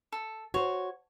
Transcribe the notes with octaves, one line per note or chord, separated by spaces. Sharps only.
A4
F#4 C5 C#5